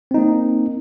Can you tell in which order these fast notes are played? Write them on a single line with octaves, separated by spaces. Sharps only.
C4 D#4 A#3